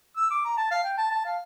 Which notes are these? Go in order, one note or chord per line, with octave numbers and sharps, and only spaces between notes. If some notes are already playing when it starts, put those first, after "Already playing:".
E6
D6
A#5
A5
F5
G5
A5
A5
F5